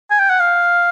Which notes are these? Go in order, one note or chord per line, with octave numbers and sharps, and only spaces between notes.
G#5
G5
F#5
F5